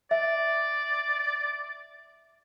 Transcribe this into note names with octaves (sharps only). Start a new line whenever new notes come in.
D5 E5